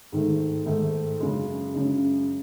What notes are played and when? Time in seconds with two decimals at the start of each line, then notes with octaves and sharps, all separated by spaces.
0.12 G#2 D#3 A3
0.66 G#2 D#3 A3
1.20 F#2 C#3 G#3
1.74 F#2 C#3 G#3